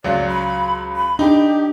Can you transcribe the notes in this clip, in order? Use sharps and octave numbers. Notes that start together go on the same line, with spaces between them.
C#2 F#3 D5
B5
B5
D4 D#4 G4